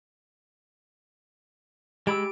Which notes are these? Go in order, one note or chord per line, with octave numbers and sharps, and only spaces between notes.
G#3 G4 B5 E6 D7